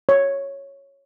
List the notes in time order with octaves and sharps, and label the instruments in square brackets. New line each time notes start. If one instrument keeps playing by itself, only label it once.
[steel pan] C#5